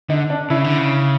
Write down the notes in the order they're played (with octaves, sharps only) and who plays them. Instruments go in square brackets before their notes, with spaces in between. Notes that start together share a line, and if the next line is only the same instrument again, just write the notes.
[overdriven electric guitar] D3 [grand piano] D#4
[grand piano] D4
[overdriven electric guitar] C#3 [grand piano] E4
[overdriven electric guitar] D3
C#3